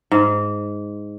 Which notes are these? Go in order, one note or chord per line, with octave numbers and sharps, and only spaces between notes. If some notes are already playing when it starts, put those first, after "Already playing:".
G#2